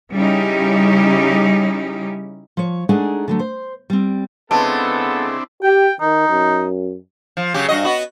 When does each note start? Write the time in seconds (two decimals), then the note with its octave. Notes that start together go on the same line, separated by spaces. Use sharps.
0.11 C#3 G3 C#4 D#4 E4 G4
2.57 F3 C#5
2.89 G#3 A3 D4 D#4 G#4 F#5
3.28 D3 F#3 A3
3.39 C5
3.90 G3 C4
4.51 C#3 G#3 B3 C4 D4 E4 A4 A5
5.63 G4 G5
6.01 D#3 D#4
6.29 F#2
7.37 F3
7.54 C#3 F#3 G4
7.69 G2 F#4 D#5
7.85 B3 F#4